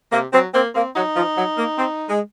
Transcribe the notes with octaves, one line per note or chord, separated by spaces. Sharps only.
C3 A#3
F#3 C4
A#3 C4
A#3 C4
F#3 D#4
F3
F#3
A#3
C4
G#3